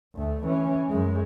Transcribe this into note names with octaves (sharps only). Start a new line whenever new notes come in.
D2 A3
E3 C#4
F#2 G#3